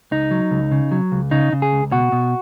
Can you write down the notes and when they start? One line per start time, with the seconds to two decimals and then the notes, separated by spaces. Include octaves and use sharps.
0.11 C#2 D#4
0.31 F#3
0.51 C#2
0.72 C#3
0.92 F#3
1.12 C#2
1.31 C#3 D#4
1.53 C#3
1.62 G#4
1.73 C#2
1.92 B2 F#4
2.12 B2